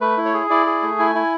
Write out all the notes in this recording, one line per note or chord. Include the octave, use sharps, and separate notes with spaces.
A3 B4
E4
C#5
G#4
E4 D5
G#4
A3
E4 G#5
E4